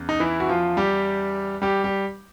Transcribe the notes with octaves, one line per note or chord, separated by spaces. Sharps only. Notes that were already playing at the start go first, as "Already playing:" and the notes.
Already playing: E2 C#3
D#4
E3 E4
F#4
F3 F4
G3 G4
G3 G4
G3 G4